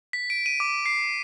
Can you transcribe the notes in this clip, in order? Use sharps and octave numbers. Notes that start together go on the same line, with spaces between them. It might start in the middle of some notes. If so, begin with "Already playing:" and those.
B6
D7
D#7
D6
C7